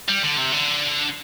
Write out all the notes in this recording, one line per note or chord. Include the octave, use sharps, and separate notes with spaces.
G3
D3
C3
D3